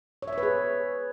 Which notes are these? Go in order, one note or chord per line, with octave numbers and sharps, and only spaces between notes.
C#5
E5
C#5
B4
G#4